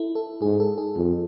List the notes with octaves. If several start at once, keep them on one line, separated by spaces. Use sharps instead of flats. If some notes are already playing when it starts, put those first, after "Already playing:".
Already playing: E4 A4
A4
G#2 G#4
A4
G#4
F2